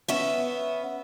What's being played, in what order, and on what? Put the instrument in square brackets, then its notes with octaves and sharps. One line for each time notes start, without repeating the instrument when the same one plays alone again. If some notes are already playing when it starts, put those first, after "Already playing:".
[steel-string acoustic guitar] B3 C#4 E5